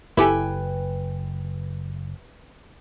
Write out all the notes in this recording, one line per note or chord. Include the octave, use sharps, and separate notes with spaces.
F#1 E4 G4 A4 B4 G5 G#5